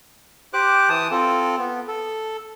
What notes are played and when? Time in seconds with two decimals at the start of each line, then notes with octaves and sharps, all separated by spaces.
0.53 G4 C5 D6 F#6
0.89 E3 A5 D#6
1.11 C4 F4 A4
1.59 B3
1.88 A4